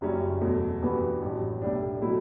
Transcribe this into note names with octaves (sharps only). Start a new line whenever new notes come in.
F#1 F#2 C#3 G3 C#4
E2 B2 F#3 A3
G2 E3 B3 F#4
A1 G2 F#3
B1 A2 G3 D4
B2 F#3 A3 E4